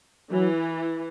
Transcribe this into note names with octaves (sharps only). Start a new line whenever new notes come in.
E3 F#3